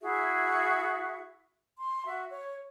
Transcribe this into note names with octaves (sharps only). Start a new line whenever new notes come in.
E4 F#4 G#4 E5
C6
F#4 E5
C#5